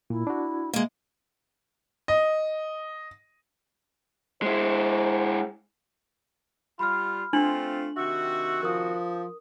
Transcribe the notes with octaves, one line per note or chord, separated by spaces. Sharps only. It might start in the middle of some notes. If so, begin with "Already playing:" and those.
A#2 E4
D4 F#4
G#3 A#3 D#5
D#5
G#3 E4 C5
G3 F4 B5 F6
A3 C4 D4 F4 F#7
C3 D#3 F#4 E5
F3 A#4 D#6